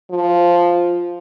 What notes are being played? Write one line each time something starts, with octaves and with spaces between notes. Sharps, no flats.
F3